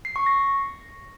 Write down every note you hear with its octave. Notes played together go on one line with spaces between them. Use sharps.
C7
C#6
A#6